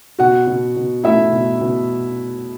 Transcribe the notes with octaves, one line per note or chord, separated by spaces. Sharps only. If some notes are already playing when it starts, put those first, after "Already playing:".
B2 F#4 F#5
B2
B2
A3 E4 E5
B2
B2